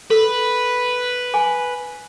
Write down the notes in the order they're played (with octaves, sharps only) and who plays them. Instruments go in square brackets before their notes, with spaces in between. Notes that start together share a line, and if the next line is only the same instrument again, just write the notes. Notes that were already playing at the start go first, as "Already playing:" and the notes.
[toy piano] A4 [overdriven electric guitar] B4
[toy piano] G#5 D6